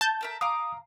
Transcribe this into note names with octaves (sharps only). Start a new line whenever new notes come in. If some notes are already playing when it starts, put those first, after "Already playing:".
A5 G6
A4 A#4 E5
F5 A#5 D6 D#6